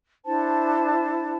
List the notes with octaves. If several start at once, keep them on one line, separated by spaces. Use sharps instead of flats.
D4 E4 C5 A5